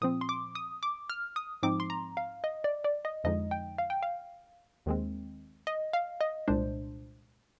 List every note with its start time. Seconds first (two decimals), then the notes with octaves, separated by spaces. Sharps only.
0.01 A#2 F3 C4 D#6
0.21 C6
0.29 D6
0.55 D#6
0.83 D6
1.10 F6
1.36 D#6
1.63 G#2 F3 C4 D#4 D6
1.80 C6
1.90 A#5
2.17 F5
2.44 D#5
2.64 D5
2.84 D5
3.05 D#5
3.24 F2 D3 F3 G#3 D#4 D#5
3.51 G5
3.78 F5
3.90 G5
4.03 F5
4.86 D#2 D#3 G#3 C4
5.67 D#5
5.93 F5
6.21 D#5
6.48 C2 A#2 G#3 D4 C5